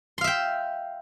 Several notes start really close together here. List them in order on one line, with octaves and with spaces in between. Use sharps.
C6 F5 E5 G5